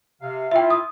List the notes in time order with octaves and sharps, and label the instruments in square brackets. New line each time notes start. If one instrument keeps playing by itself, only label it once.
[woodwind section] C3 F5
[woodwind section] E4 F4 [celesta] E5 G5
[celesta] D#6